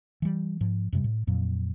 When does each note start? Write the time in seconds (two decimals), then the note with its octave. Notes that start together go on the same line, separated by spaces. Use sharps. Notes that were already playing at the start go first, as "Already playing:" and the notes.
0.22 E3 G3
0.61 G#2 F3
0.93 F#2 C3 G3
1.04 A2
1.27 F2 A#2 F#3